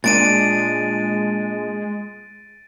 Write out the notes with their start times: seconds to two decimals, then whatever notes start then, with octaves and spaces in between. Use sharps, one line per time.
0.04 A#2 G#3 D4 A6 D7 D#7